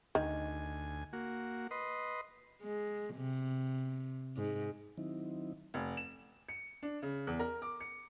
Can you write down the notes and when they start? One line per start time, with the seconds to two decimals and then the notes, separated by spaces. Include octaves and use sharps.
0.15 D2 D#3 G#5
1.13 A#3 F#4
1.71 B4 D#5 C6
2.62 G#3
3.15 C3
4.36 G#2
4.98 D#3 F#3 C4 D#4 E4
5.74 F1
5.97 E7
6.49 C#7
6.83 D4
7.02 C#3
7.27 E2
7.39 A#4
7.62 D6
7.81 C#7